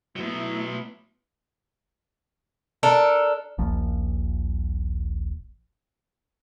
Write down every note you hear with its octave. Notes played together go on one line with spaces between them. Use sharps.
F#3 A3 B3 E4
D4 A4 A#4
D#1 A#1 A#2 F3